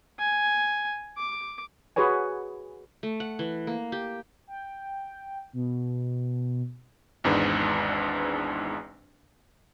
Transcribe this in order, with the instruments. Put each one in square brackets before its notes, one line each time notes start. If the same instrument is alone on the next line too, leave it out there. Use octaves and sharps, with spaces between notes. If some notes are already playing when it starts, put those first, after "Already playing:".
[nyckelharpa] G#5
D6
[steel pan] F#4 G#4 B4 C#5 G#5
[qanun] A3
F#5
E3
A#3
G4
[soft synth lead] G5
B2
[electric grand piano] G#1 E2 G#2 D4 B4